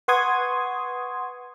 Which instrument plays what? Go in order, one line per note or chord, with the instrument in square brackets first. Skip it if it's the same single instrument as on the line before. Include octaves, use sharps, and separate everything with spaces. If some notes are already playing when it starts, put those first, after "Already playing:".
[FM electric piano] B4 F#5 C6 C#6 D#6 G#6